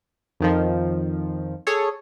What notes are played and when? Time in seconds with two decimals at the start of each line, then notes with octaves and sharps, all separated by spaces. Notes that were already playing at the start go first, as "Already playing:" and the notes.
0.40 F2 D#3 F3
1.67 G#4 A4 C#5